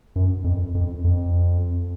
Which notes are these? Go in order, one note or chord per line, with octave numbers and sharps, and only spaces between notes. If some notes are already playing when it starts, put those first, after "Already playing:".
F#2
F2
F2
F2